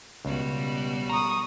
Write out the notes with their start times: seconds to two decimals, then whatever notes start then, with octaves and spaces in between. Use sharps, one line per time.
0.25 C#2 B2 G3 F#4
1.10 A#5 C#6 D#6